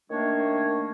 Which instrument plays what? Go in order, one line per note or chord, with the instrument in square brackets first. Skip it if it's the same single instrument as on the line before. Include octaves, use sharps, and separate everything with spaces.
[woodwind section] D#3 A3 A#3 D4 C#5